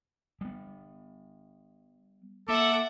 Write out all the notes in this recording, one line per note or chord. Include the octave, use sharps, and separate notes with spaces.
G3 B3
A#3 A4 E5 F#5 D6